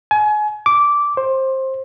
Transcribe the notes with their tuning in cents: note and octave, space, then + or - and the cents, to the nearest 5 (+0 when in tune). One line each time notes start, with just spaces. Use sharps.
G#5 +30
D6 -10
C5 +20